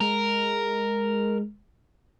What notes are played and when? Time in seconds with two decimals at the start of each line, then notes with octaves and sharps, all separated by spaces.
0.01 G#3 A#4